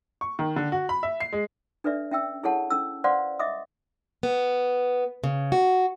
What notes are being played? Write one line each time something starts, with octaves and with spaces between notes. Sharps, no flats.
C#6
D#3
D3
F#4
B5
E5
C7
G#3
D4 A4 B4 D5 E5
C#4 E5 G5 E6
E4 G#4 A4 C#5 F#5 A5
C#4 A4 E6
B4 C5 D5 F5 F#5 C6
D#5 E5 D6 D#6
B3
C#3
F#4